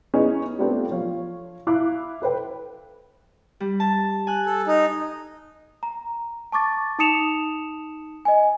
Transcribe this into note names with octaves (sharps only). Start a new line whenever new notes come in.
B3 C#4 D#4 E4 G#4 C#5
A3 B3 C4 D4 F4 G4
F3 C#5 F5
E4 F5 D6 F#6
A4 B4 C5 G5
G3
A5
G#5 F#6
A4
D#4
A#5
A5 C#6 D6 A6
D#4 A5 D#6 C#7 E7 F7
D#5 G#5